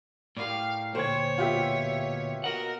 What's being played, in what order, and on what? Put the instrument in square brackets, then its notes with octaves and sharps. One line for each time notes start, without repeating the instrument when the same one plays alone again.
[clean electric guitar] A2 [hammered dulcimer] G4 A#4 D5 [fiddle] F5
[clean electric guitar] D2 A#2 [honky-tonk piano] C5 G#6 [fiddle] C#5 [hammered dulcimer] G5 G#5 C#6
[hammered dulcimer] B2 A#3 [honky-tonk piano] F4 G4 E5
[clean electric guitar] F#4 D#5 F#5 [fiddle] A#4